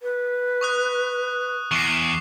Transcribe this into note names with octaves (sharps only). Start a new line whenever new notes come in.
B4
C#6 D#6 F#6
E2 C#6 D6 C7